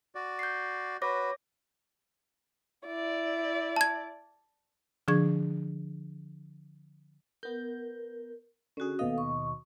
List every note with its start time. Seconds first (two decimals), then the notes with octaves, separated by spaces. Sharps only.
0.15 F#4 D5
0.39 G6 C7
1.02 F#4 B4 C#5 D6 A#6
2.87 E4 D5
3.76 A5 G#6
5.08 D3 F3 D4 G#4 C#6 G#6
7.43 B3 A#4 G6
8.77 D3 C#4 F#4 G#4
8.99 D#2 B2 A4 D#5 F5
9.18 C#6